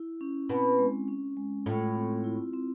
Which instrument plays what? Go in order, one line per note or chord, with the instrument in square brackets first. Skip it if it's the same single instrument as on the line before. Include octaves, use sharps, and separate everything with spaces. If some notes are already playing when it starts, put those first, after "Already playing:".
Already playing: [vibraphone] E4
C#4
[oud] B2 B3 [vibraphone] C4
[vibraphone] G#3
C#4
G#3
[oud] A2 A3 [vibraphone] F4
[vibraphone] C4
E4
C4